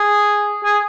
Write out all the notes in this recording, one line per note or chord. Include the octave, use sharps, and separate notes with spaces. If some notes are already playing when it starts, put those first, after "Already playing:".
Already playing: G#4
G#4